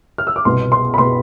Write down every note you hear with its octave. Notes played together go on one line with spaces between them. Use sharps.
F6
E6
D6
C2 B2 B3 C6
C6
B5
B2 B3 C6